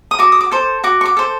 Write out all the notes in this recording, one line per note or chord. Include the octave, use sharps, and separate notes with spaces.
D#6
F#4 D6
D#6
D6
A4 C5
F#4 D6
C#6
D6
A4 C5